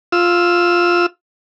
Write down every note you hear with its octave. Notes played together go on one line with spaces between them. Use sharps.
F4 E6